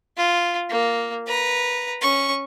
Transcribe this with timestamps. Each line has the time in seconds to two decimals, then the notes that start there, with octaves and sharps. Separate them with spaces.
0.17 F4
0.70 A#3
1.27 B4 A#5
2.01 C#4 C#6